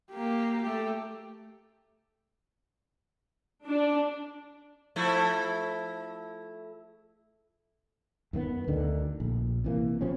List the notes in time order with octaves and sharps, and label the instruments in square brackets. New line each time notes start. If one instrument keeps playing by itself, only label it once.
[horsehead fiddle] A#3 G4
A3 G4
[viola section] D4
[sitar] F3 A3 E4
[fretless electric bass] F#2 D#3 A#3 B3
D2 D3 D#3
A#1
C3 E3 A#3
B2 F3 C4 C#4